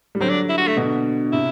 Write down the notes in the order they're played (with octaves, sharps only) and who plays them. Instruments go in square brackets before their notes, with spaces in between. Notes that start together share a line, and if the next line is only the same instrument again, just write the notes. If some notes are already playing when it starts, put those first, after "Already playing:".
[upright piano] G3
[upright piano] D3 F#3 [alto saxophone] C4
[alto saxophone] D4
E4
F#4
A3
[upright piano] B2 D3
[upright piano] C3 [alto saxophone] E4